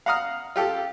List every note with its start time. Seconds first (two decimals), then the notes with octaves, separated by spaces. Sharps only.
0.06 F5 F#5 A#5 D#6 F6
0.56 F4 G4 A4